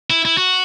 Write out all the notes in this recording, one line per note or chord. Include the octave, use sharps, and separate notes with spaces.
E4
E4
F#4